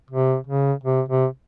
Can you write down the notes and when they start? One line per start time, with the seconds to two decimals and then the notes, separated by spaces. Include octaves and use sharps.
0.11 C3
0.47 C#3
0.84 C3
1.09 C3